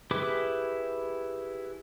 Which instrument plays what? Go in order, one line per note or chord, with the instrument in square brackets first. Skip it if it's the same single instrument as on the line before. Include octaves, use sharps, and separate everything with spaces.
[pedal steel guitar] E4 G4 G#4 B4 D6